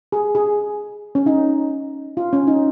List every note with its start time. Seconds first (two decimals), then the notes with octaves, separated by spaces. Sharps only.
0.12 G#4
0.35 G#4
1.15 C#4
1.26 D#4
2.17 F4
2.33 C#4
2.47 D#4